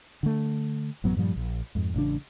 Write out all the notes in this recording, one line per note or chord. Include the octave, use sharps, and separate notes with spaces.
D3 A3
A1 F#2 F#3 B3
G2 A#2 F3 G3
A#1
F2 G#2
A1 C#3 D4